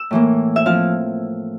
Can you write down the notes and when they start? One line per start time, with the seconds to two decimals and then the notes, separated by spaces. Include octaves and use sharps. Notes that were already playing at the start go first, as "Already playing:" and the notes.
Already playing: E6
0.11 A2 E3 A#3
0.56 E5
0.65 F3 C4 E4 F5